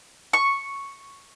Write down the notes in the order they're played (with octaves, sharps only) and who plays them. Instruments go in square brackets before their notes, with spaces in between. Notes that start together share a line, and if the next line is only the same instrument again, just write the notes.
[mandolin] C#6